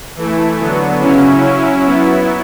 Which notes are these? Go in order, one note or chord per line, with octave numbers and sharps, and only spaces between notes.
E3 A3 E4
D3 F#3 B3
C#3 F#3 C#4 E4
F#3 C#4 E4
F#3 B3 E4